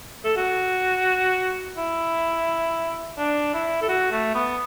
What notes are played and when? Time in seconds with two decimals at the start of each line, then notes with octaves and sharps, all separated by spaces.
0.25 A4
0.37 F#4
1.77 E4
3.18 D4
3.54 E4
3.82 A4
3.89 F#4
4.11 A3
4.35 B3